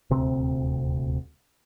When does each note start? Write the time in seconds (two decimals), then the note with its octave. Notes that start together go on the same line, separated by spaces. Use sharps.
0.10 D#1 D2 C3 C4